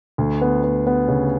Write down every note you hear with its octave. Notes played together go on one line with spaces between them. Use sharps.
D2
B3
B3
B3
C#3